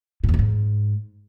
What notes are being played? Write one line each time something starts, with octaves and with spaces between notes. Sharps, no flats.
A2
E2
A#2
G#2